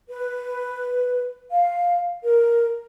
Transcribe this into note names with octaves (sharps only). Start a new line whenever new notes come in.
B4
F5
A#4